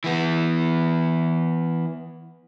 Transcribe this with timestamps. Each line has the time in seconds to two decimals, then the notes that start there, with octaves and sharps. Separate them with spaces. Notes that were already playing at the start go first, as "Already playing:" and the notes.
0.04 E3 B3